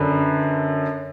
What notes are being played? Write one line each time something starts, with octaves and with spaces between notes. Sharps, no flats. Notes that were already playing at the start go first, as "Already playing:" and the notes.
Already playing: F#2 D3 B4